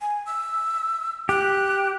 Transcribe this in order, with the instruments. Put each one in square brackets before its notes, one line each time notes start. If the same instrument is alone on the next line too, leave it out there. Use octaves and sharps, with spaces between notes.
[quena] G#5
E6
[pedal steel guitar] G4 [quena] F#6